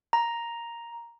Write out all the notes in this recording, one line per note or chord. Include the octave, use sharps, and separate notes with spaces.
A#5